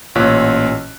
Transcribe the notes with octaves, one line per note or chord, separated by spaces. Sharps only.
A1 A#2 F4 C#5 F#6 B6